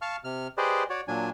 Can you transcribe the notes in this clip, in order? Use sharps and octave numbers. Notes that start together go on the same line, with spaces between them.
F5 A5 C#6 F6
C3 F6
G4 G#4 B4 C5 D5 D#5
F#4 C#5 D5
A#2 F#3 D4 G#5